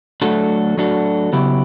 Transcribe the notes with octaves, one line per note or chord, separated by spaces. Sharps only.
F#3 A3 D4 F#4 A4
F#3 A3 D4 F#4 A4
C#3 F#3 B3 E4 G4